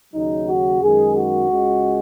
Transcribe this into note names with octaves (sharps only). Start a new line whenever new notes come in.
D#2 C#3 F#3 D#4
F#4
F#2 D#3 G#3 G#4
F#4
C#2 C#3 G#3